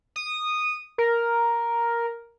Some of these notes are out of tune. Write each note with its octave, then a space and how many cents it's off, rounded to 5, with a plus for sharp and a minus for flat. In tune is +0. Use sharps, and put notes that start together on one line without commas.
D#6 -10
A#4 +5